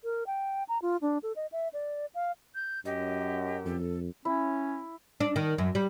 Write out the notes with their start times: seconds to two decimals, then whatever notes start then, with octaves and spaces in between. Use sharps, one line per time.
0.04 A#4
0.27 G5
0.69 A#5
0.82 F4
1.01 D4
1.23 A4
1.36 D#5
1.52 E5
1.73 D5
2.14 F5
2.55 G6
2.85 F#2 G4 D#5
3.65 F2 A4
4.25 C#4 E4
5.20 D4
5.36 D#3
5.58 F#2
5.75 G3